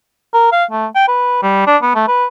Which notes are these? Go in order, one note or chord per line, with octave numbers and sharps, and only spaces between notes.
A#4
F5
A3
G5
B4
G3
D4
B3
A3
B4